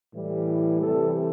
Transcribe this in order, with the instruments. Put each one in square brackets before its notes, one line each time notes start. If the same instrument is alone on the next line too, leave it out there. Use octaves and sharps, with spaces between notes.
[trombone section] A2 E3 G3
C3 E3 G3 A4